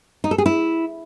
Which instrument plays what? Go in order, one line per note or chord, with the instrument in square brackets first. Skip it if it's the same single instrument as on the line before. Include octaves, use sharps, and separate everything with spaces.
[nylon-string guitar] D#4
A4
G#4
E4